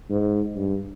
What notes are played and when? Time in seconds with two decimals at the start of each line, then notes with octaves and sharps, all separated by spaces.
0.10 G#2
0.56 G2